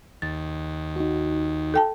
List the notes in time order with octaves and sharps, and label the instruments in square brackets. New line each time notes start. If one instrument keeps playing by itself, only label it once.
[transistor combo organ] D#2 [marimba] A6
[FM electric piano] D#4 F#4
[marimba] A4 G5 A5